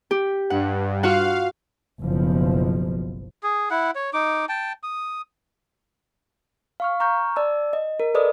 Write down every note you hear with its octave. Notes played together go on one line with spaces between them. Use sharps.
G4
G2 F#5
F4 F#4 F5 F#5
F#1 B1 B2 F3
G#4
E4 F#5
C#5
D#4 D6
G5 A5
D#6
F5 C#6 F6
A#5 C#6 F6 G6
D5 A5 E6
D#5
A#4
A4 B4 D5 D#5 D#6